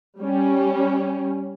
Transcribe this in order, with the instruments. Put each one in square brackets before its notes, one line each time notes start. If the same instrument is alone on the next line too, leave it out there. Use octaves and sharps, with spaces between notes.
[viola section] G3 C#4